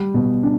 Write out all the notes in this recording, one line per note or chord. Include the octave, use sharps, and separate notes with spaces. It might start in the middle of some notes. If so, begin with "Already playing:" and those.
Already playing: G3
B2
D4